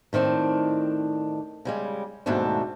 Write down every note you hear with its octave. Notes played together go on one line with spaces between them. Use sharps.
A2 D#3 C4 D4
C#3 G3 G#3
D#2 G#2 B2 A3 C4 D4